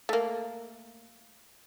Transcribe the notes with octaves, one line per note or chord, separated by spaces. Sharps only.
A3 A#3